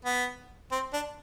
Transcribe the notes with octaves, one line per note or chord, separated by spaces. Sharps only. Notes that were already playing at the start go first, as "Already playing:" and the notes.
B3
C4
D4